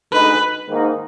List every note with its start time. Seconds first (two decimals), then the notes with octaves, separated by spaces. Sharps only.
0.11 D2 D3 G#3 D#4 B4
0.68 G#2 D#3 A#3 D#4